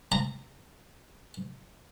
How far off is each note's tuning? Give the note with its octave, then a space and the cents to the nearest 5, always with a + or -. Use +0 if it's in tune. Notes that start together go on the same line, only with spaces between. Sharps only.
A#5 -20